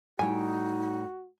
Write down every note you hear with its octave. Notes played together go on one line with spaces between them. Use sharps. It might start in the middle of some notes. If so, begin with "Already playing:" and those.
A2 G3 D#4 F#4 G5 G#5